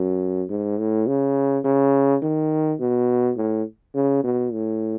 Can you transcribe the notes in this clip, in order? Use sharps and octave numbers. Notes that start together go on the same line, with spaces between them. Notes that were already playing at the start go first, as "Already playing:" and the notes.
Already playing: F#2
G#2
A2
C#3
C#3
D#3
B2
A2
C#3
B2
A2